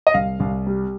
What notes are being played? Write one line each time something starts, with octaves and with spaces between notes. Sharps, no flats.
D#5
C2 F5
C2
G3